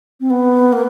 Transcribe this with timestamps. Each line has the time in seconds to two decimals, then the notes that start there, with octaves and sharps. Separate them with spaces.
0.20 C4
0.30 B3
0.73 A#3